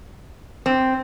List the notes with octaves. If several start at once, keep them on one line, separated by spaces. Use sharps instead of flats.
C4